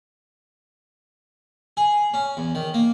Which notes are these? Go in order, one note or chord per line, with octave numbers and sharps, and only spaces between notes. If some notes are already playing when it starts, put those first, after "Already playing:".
G#4
C#4
E2
D#3
A#3